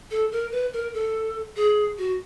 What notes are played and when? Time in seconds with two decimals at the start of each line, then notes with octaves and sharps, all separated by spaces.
0.11 A4
0.32 A#4
0.52 B4
0.73 A#4
0.94 A4
1.56 G#4
1.98 F#4